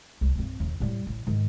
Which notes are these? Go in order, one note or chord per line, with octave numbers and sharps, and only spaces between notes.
C2
G2 C4
A#1 D#2
A2 G3
A1
G#2 D#3